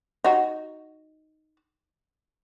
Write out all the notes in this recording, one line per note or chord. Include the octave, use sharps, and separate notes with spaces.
D#4 F#4